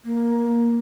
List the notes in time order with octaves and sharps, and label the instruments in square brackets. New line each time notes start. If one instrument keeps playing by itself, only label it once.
[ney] A#3